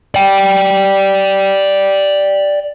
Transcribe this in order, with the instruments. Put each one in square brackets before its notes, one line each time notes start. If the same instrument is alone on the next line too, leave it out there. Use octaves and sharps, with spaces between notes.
[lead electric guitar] D5 G5